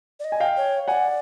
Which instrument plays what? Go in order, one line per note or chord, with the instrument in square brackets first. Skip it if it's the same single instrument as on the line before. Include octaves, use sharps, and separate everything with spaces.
[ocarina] D5
D#5
[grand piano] G#5
F5 G5
[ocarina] C#5
[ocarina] D5 [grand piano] F#5 G#5